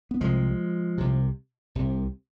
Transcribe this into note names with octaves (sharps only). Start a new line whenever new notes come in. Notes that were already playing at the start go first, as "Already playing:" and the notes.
B3
C2 C3 F3 G#3
C2 C3
C2 C3